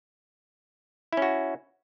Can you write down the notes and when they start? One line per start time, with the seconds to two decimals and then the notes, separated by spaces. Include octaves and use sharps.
1.13 E4
1.17 C#4
1.22 F#4